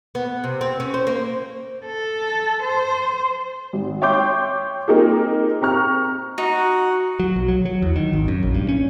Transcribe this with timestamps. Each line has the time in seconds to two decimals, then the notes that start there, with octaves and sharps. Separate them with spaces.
0.15 B3
0.44 C3
0.61 C4
0.80 C#4
0.94 C5
1.07 A#3
1.86 A4
2.62 C5
3.73 G#1
4.02 C#5 E5 G5 C6 D6 G6
4.88 A#3 C4 D#4 F4 G#4
5.61 C4 A#5 C#6 F6
6.38 D#4 F#4
7.20 F#3
7.36 B1
7.48 F#3
7.65 F#3
7.82 E2
7.96 D#3
8.13 G#1
8.28 F#2
8.43 A#1
8.54 G2
8.69 C#4